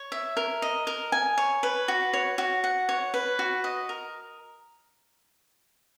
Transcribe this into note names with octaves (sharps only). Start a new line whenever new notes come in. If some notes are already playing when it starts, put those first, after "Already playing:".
Already playing: C#5
E5
A#4
D#5
A#4
G#5
C#5
B4
F#4
C#5
F#4
F#5
C#5
B4
F#4
D#5
A#4